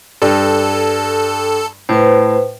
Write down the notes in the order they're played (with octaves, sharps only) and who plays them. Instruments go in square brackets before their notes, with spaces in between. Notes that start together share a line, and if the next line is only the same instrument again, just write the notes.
[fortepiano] G2 [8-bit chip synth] A4
[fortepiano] A2 [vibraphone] B4 C5